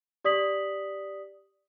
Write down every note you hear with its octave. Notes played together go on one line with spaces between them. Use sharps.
G4 D5 D#6 B6 F#7